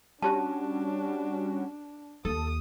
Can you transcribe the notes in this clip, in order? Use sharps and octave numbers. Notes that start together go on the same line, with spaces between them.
G3 C#4 D4 F#4 G4 A5
D#2 A4 D#6